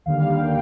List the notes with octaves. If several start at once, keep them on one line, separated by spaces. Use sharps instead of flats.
D#2 D3 G3 A#3 F5
G5